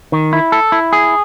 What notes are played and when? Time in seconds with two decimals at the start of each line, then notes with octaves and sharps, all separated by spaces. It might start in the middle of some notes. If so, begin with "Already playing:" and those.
0.12 D#3
0.33 E4
0.52 A4
0.72 E4
0.93 G#4